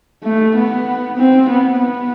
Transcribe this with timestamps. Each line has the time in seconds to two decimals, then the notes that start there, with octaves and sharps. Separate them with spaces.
0.24 A3
0.55 B3
1.17 C4
1.49 B3
1.79 B3